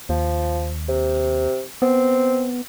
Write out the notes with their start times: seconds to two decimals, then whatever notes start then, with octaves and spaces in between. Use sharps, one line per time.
0.09 D#2 F3
0.89 C3
1.82 B3 C4